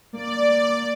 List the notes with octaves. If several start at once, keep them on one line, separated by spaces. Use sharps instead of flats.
A#3 D5